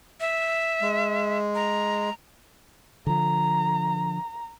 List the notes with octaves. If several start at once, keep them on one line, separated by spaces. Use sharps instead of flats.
E5
G#3
A#5
D3 F3 A#5